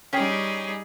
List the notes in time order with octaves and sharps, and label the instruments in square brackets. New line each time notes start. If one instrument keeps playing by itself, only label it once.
[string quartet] G3 D#4 G#4 [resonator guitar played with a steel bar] C#4 C#5 G5